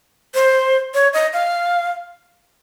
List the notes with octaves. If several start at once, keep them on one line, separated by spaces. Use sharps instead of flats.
C5
C#5
D#5
F5